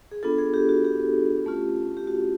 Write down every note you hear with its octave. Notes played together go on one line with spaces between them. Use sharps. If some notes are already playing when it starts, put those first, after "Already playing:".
G#4
B3 D4 F4 A4
G#4
G4
F#4
G4
A3 C#4 F4
G4
F#4